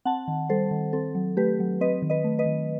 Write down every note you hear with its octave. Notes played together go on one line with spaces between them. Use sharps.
C4 F#5 A5
D#3
G3 A4 C5
D#3
C4 A4
F#3
A3 G4 B4
F#3
C4 B4 D#5
D#3
B4 D#5
A3
B4 D#5
D#3